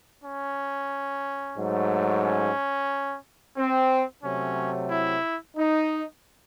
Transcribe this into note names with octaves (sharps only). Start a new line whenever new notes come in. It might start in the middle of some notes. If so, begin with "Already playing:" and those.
C#4
G#2 F#3 A3
C#4
C4
C3 F#3 A3 C#4
E4
D#4